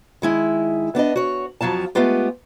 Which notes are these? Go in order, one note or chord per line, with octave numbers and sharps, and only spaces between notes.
D#3 G#3 E4
B3 D4 B4 D#5
F#4 C#5
F2 F3 F#3 F4 A5
G#3 A3 B3 F4 G4